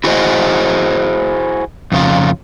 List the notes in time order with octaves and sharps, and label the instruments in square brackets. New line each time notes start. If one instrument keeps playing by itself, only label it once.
[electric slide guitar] E4 F#4 G#4 A4 C5 D#5
F2 C#3 F4